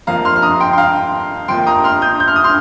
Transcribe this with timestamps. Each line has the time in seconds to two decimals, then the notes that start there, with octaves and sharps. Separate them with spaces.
0.07 F2 F3 A#3 F5 A#5
0.25 C6 F6
0.36 F6
0.42 A#5 D#6
0.60 G5 C6
0.73 C6
0.78 F5 A#5
1.48 F2 F3 A#3 G5 C6
1.67 A#5 D#6
1.84 C6 F6
2.02 D#6 G6
2.20 G6
2.28 F6
2.36 D#6
2.44 C6 F6